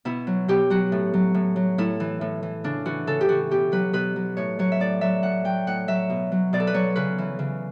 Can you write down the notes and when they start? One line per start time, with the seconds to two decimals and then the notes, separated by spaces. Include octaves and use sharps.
0.05 B2 E4
0.27 F#3
0.48 B2 G4
0.70 F#3 F#4
0.92 A2
1.14 F#3
1.34 A2
1.56 F#3
1.78 A2 E4
2.00 E3
2.21 A2
2.43 E3
2.64 C#3 D4
2.85 E3 F#4
3.07 C#3 A4
3.21 G4
3.29 E3 F#4
3.51 B2 G4
3.72 F#3 B4
3.93 B2 B4
4.16 F#3
4.37 A2 C#5
4.59 F#3 C#5
4.72 E5
4.80 A2 D5
5.01 F#3 E5
5.23 A2 F#5
5.44 F#3 G5
5.67 A2 F#5
5.88 F#3 E5
6.09 B2
6.32 F#3
6.53 B2 D5
6.60 A4
6.67 B4
6.74 F#3 C#5
6.96 C#3 B4
7.18 E3
7.39 C#3